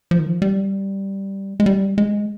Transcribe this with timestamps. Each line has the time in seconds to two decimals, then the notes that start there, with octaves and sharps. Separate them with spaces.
0.11 F3
0.19 D#3
0.27 F3
0.42 G3
1.60 G#3
1.66 G3
1.98 G#3